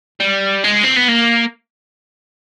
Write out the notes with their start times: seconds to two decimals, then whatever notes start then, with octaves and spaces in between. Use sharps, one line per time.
0.20 G3
0.64 G#3
0.84 C4
0.97 B3
1.09 A#3